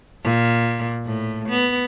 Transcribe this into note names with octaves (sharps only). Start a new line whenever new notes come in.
A#2
A2
B3